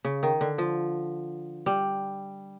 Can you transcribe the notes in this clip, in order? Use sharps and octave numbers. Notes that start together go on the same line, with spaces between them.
C#3
D#3
D3
F3
G3